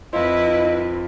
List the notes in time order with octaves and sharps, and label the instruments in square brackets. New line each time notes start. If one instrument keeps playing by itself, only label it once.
[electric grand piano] F2 C5 [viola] E4 B4 [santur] F4 [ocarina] D#5